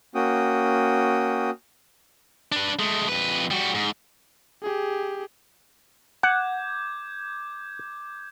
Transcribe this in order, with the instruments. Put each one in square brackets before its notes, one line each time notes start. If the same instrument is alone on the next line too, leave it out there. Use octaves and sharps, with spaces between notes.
[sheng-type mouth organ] A#3 C#4 F#4 G5 D#6
[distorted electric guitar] D4 B4
G#3 A3
F2 B4
G3 F#4
G#2
[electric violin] G4 G#4
[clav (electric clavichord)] F#5 [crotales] D6 G6 G#6